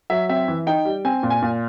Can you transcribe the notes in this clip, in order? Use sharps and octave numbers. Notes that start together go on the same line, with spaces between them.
F#3 E5
C4 E5
E3
D#4 G5
G3
C4 G#5
A#2
G#5
A#2